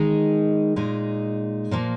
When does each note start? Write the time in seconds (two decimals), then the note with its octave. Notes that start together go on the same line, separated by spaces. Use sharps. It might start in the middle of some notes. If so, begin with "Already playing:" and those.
Already playing: D#3 G#3 D#4
0.76 A#2 G#3 D#4
1.71 A#2 F3 A#3